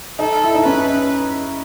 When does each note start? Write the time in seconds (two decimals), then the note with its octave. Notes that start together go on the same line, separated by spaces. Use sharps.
0.19 D#4 A4
0.44 E4
0.55 D#4
0.65 C#4 B4